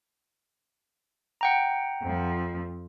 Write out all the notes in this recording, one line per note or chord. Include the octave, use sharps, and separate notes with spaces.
F#5 G5 A#5
F2 F3